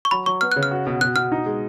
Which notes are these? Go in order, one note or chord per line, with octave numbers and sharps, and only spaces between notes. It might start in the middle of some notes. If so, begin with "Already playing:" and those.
C#6
F#3 B5
F#3 C#6
B3 F6
C#3 F#6
F6
F#4
B2
B2 F#6
B2 F6
D#4
G#3